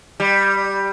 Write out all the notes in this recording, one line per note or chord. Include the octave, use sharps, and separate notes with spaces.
G3